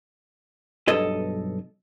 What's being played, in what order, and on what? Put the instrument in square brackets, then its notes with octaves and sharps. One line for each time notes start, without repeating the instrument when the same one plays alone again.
[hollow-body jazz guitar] B1 G2 A4 D#5